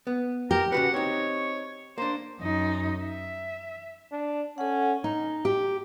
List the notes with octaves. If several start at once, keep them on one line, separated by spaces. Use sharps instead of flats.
B3
G4 A#4
C#3 F#4 B4 F#5
C4 D#4 C#5
A#3 D4 C5
F#2 D#4
E5
D4
C#4 A4 F#5
D#4
G4